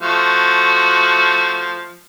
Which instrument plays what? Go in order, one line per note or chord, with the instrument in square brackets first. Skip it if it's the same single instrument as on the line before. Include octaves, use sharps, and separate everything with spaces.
[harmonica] F3 A3 F#4